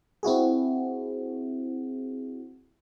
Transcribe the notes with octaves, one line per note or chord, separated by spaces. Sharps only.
C4 E4 F#4 G#4